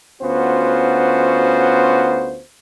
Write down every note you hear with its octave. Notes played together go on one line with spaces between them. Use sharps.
D2 B3 C#4 F4 F#4 C5